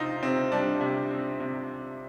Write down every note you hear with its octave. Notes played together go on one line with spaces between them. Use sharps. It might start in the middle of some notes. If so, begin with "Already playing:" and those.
Already playing: C3 C4 D#4 F4
C3 C4
G3 D4
C3
C4
C3